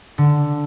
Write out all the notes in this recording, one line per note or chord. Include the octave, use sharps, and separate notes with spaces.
D3